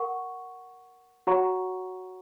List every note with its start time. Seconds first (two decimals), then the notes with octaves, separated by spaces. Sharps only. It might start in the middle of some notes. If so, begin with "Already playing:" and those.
Already playing: A#4 F#5 C#6
1.27 F#4 C#5 F#5 A#5 C#6